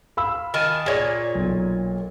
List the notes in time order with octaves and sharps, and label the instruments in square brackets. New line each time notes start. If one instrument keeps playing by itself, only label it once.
[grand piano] F5 B5 E6
[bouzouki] D#3 G#5 A5
[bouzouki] A#2 C#5 [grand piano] G#4 D5
[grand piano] B1